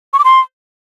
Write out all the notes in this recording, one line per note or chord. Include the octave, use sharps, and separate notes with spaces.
C#6
D6
C6